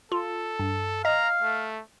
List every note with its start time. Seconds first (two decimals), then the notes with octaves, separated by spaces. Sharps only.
0.12 F4 A4
0.59 G2
1.05 D#5 F5 A#5
1.42 A3